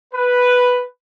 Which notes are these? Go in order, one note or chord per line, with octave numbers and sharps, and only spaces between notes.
B4